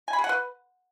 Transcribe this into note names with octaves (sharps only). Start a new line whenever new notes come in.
G#5
B5
G#4
F#5
B4